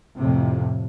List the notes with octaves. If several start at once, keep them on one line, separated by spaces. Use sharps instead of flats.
F2 A2 C3